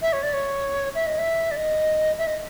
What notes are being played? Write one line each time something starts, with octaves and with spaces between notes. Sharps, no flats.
E5
C#5
D5
C#5
E5
D#5
E5
D5
D#5
E5
D#5